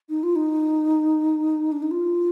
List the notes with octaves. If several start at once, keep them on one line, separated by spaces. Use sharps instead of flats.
D#4
F4
D#4
D4
D#4
F4